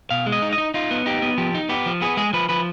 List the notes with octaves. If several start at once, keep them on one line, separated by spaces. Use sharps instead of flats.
B2 F5
G#3
D#5
D#4
D#5
D#4
D#4 F4
B3
D#4 G4
B3
F3 G4
D#4
B3 G4
F3
B3 G#4
G#3 G#4
F3 B4
F3 B4